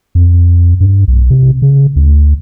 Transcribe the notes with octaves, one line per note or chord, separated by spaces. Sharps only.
F2
G2
B1
C3
C#3
D2